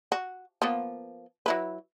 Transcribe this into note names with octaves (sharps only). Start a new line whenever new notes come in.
F#4
F3 A#3 B3
F#3 E4 B4